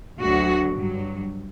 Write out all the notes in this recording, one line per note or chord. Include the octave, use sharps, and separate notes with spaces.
D2 D3 F#3 F#4
G2 F#3